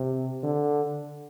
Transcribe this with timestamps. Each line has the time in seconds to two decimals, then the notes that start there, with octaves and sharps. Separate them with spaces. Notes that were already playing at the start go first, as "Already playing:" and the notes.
Already playing: C3
0.43 D3